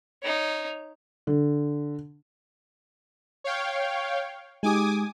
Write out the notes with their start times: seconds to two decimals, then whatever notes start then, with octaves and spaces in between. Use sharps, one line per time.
0.23 D#4 C#5
1.27 D3
3.44 C#5 F5 G5
4.63 G#3 D#4 G4 G#5 D6 D#6